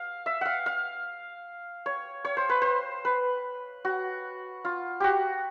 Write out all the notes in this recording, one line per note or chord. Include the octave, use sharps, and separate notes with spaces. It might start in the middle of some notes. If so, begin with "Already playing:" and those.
Already playing: F5
E5
F5 F#5
F5
C#5
C#5
C5
B4
C5
B4
F#4
F4
F#4 G4